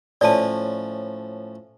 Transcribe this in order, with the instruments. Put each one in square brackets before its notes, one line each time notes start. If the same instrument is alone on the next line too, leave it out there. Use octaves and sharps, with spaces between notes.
[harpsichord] A2 F3 C#4 [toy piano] D5 A5